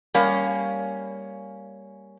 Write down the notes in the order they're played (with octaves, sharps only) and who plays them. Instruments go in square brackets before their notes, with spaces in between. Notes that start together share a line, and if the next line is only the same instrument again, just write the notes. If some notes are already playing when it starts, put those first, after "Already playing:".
[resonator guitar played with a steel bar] G3 A#3 C#4 F5